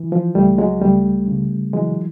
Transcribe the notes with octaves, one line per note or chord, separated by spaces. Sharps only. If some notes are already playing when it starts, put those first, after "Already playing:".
Already playing: E3
F3
C#2 G3 A3
F#3 G#3
C#2 G3 A3
C#3
E3 F#3 G#3